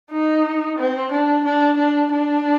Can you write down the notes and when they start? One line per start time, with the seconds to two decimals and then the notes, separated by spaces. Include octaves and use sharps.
0.11 D#4
0.78 C4
1.12 D4
1.44 D4
1.78 D4
2.12 D4